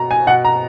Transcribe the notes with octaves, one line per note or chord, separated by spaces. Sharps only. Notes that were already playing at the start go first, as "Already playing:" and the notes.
Already playing: B2 A#5
G#5
B2 F#5
A#5